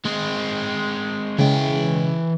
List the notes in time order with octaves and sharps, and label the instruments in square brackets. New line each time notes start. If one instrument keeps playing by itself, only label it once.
[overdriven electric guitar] G#3 C4
[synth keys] C#3 G#3 [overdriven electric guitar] E3 G5